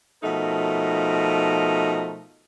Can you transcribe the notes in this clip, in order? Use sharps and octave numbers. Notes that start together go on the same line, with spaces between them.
B2 F3 A3 D#4 A#4